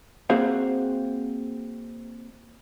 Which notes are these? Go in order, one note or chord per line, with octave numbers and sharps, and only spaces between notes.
A#3 C4 F#4 G#4 C5 F5